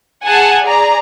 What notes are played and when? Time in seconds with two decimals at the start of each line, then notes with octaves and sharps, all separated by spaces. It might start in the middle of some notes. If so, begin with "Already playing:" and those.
0.25 G#4 F#5 G#5 A5
0.64 G#4 D5 A#5